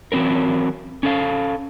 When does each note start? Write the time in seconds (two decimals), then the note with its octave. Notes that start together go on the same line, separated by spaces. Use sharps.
0.12 E3 F#3 C4 C#4 A#4
1.03 C#4 A4 F5